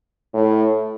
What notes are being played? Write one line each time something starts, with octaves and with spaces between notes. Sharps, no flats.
A2